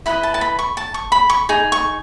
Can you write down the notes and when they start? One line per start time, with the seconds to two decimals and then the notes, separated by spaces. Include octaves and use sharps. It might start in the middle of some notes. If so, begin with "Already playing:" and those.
0.06 E4 B4 D#5 B5
0.23 A5
0.34 A5
0.41 B5
0.59 C#6
0.77 A5
0.94 C#6
1.12 B5
1.30 C#6
1.49 D#4 G#4
1.72 C#6